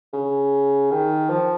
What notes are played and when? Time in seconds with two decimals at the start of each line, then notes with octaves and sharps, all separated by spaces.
0.13 C#3
0.91 D#3
1.30 F3